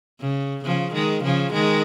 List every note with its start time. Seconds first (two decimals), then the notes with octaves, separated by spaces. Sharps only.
0.20 C#3
0.64 C#3 F3
0.93 D#3 G#3
1.23 C#3 F3
1.53 D#3 G#3